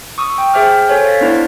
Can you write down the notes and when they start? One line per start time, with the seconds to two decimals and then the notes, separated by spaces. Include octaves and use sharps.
0.18 C#6 D#6 E6
0.38 G5
0.54 G#4 C5 E5 G5 D6 F6
0.88 A4 C5 C#5 G#5
1.05 F5 A6 B6
1.21 B3 D4 E4 C5 D5